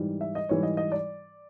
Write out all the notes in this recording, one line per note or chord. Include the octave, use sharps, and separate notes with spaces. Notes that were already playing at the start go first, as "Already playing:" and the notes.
Already playing: G#2 E3 G3
E5
D#5
G#2 E3 G3 C#5
D#5
D#5
D5